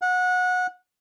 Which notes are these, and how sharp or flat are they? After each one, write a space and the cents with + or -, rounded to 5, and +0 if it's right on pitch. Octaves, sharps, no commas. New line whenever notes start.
F#5 -25